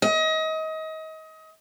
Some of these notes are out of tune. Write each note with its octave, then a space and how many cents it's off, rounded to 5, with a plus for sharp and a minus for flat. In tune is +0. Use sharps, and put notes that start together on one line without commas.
D#5 +30